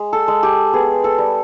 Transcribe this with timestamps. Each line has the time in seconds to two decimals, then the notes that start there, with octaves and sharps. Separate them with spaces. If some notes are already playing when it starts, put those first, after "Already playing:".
Already playing: G#3
0.13 A4
0.28 G#3
0.43 G4
0.73 B3 G#4
1.04 A4
1.18 G3